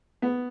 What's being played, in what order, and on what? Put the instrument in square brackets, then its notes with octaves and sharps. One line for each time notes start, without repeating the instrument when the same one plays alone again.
[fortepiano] B3